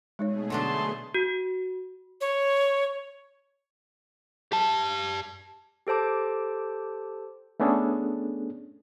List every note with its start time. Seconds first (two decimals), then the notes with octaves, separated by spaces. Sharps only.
0.19 B2 G#3 A3 D#4 G#4 C#5
0.50 D3 F#3 D4 A5 C6
1.14 F#4
2.21 C#5
4.52 G4 A5
5.87 G4 A4 C5 A5 D6
7.60 A3 B3 C#4 D4 G#4 A4